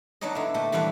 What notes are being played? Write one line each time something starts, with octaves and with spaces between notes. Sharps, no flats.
F#3 B3 D4 D#4 C#5 D#5
D3 E4
A#2 A3 G4
D3 E3 G3 B3 D4